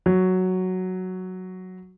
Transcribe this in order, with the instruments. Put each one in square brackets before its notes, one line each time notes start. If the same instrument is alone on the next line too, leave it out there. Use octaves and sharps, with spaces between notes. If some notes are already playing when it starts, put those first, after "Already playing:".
[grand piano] F#3